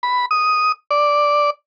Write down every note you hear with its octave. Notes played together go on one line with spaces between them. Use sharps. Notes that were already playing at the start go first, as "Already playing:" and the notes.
B5
D#6
D5